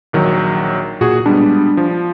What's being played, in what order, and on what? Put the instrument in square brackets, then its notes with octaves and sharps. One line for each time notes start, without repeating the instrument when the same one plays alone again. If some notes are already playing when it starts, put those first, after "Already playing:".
[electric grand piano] A#1 D#3 F#3
[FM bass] A#2 [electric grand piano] F#4 G#4
[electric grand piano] G3 G#3 B3 [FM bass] D4
[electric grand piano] F3